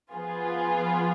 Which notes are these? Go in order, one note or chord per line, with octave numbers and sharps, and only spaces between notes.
F3 B3 F4 G#4